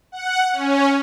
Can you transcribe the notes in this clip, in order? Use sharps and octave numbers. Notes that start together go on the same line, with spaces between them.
F#5
C#4